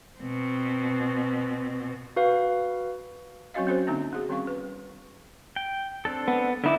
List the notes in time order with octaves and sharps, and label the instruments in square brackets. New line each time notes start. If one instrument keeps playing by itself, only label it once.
[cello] B2 C4
[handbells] F#4 B4 F5
[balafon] F#3 C4 C#4 F#4 D#5 F5
C4 C#4 F#4 A4 C5
D3 A#3 C4 D4 D#4
B3 F#4 G#4
D#3 G3 C4 C#4 F5 C#6
B4
[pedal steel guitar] G5
C4 D4 A4
[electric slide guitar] B3
[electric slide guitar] D3 E4 [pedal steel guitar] B3 D#4 D6